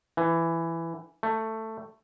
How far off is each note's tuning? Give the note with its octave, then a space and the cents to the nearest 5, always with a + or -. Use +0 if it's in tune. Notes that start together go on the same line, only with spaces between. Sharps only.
E3 +10
A3 +10